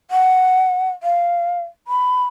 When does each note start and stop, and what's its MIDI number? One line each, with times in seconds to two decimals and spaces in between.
0.11 0.89 78
1.03 1.61 77
1.88 2.25 83